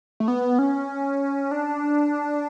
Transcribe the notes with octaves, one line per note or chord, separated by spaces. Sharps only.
A3
B3
C#4
D4